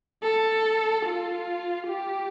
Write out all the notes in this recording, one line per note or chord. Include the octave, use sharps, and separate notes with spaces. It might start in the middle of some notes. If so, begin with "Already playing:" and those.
A4
F4
G4